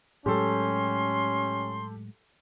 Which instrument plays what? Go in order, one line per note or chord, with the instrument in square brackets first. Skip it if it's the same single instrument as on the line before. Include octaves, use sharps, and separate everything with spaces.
[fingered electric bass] A2 F#3 G#3 [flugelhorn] C#4 [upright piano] G4 A4 [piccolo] C6